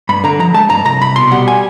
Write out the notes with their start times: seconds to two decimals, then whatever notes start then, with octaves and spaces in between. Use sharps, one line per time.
0.09 G2 B5
0.24 D3 A#5
0.39 F3 A#5
0.54 G#3 A5
0.70 G2 A#5
0.85 C2 A#5
1.01 C2 B5
1.16 B2 C6
1.31 G3 F#5
1.48 G#5